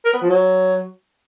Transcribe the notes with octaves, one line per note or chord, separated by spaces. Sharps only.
A#4
B3
F3
F#3